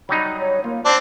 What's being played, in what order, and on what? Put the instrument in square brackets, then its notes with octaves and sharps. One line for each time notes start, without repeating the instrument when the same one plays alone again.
[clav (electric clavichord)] F#3 G3 D#4 [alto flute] B5
[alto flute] C#5
[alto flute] A#3 [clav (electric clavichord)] F4
[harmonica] C4 D4 [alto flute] D5